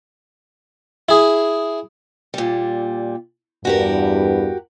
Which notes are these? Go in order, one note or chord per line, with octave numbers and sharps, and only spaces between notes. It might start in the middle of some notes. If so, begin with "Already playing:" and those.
E4 G#4
A#2 G3
E2 G2 F#4 G4 A#4